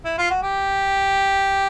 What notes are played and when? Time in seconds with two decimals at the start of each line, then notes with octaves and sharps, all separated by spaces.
0.05 E4
0.18 F4
0.30 F#4
0.43 G4